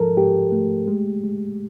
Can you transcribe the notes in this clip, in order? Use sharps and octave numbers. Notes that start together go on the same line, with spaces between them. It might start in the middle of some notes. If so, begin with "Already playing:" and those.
Already playing: G#2 F3 A4 A#4
G#2 G4
A3
G#3
G#3